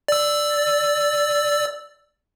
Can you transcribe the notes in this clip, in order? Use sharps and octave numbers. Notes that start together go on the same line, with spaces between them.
D5 E6